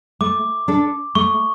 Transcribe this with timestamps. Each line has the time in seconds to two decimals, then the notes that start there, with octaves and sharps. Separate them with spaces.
0.21 A3 D6
0.68 D4 A4
1.15 A3 C#6